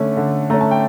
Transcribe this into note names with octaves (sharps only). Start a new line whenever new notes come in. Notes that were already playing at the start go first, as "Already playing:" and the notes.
Already playing: D3 A3 C#4
D3
A3 C#4 A#5
A5
G5